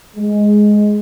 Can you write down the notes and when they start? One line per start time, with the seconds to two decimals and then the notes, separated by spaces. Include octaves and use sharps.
0.17 G#3